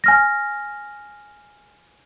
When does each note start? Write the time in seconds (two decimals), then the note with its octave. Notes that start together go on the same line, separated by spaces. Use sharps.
0.04 G#5 F6 A#6